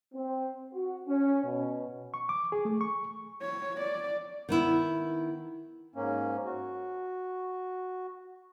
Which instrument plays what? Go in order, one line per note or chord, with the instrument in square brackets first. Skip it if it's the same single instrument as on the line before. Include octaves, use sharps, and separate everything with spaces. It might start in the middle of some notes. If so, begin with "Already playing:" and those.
[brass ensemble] C4
F#4
C#4
B2
[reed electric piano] C#6
D6
G#4
A3
C#6
[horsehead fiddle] C#5
D5
[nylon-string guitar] D#3 B3 E4
[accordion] G#2 A#3 C#4
F#4